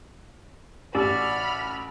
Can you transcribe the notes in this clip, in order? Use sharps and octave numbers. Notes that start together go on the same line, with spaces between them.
A1 F#4 G4 D5 B5 E6 F6